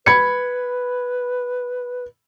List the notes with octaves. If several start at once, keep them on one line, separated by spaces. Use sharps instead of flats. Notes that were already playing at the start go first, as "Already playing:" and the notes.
B4 B5 G#6 C#7